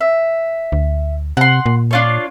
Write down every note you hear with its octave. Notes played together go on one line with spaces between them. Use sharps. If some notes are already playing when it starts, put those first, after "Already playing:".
E5
D2
C3 F#5 C6
A#2
D4 F4 C#5